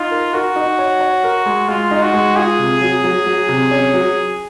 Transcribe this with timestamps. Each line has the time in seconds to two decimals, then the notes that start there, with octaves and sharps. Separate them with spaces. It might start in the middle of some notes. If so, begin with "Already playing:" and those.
Already playing: D#4 F4
0.11 A#4
0.33 F#4 A#4
0.56 D#4
0.79 C#5
1.01 C#5
1.24 A#4
1.46 G#3
1.68 G#3 F4
1.91 D#4
2.02 F#4
2.14 G#3
2.36 F4 G#4
2.58 C3
2.81 F#3
3.04 F#3
3.26 F#3
3.49 C3
3.71 C#4
3.94 F#3